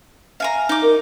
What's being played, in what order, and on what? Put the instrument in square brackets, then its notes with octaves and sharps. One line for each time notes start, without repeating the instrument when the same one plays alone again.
[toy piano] E5 [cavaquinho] F5 G#5 A#5
[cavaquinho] D#4 D6
[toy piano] A#4